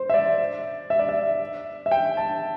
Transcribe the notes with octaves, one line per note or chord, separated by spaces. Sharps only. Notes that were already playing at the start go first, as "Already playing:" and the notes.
Already playing: C5
E5
D5
E5
D5
E5
E5
G5
A5